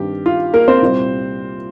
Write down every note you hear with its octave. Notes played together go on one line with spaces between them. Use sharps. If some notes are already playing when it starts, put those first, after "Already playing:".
Already playing: G2 D#3 G3 C4 G4
F4
A#3 A#4
C4 C5
C2 A#2 G3 C4